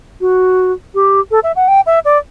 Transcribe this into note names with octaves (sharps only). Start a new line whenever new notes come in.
F#4
G4
A4
E5
F#5
G5
E5
D5